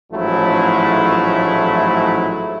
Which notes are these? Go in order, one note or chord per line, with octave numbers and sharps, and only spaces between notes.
A1 G#2 F3 F#3 A3 E4